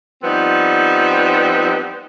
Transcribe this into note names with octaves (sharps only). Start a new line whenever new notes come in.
F3 G3 B3 C4 D#4